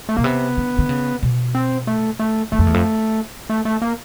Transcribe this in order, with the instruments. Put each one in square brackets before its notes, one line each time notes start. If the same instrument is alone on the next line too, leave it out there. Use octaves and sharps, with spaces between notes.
[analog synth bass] A3
[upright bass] B2 [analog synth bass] A#3
[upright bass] C3 [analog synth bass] B3
[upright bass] D3
D3
C#3
B2
[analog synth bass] C4
A3
A3
[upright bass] F#2 [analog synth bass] A3
[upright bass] F2
E2
F2
[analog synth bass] A3
A3
A#3